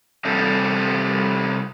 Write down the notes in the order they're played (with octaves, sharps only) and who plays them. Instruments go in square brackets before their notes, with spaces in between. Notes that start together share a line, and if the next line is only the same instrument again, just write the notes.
[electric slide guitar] C3 G3 C4 G4 A4